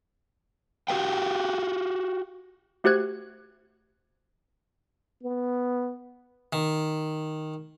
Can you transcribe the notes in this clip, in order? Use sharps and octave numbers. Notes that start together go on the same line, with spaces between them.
F#4 G4 A#4 B4 F5 G5
A3 F#4 G4 C5 F#6 G#6
B3
D#3